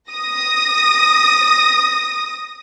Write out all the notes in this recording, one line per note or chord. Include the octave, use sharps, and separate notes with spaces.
D#6 A#6